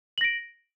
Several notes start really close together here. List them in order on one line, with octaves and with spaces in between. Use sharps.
F#7 A#6 D7